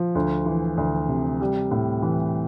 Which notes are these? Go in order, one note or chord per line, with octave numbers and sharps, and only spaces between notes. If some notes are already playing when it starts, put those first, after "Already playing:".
Already playing: F3
D2
E3
D2
C3
G3
A2
E3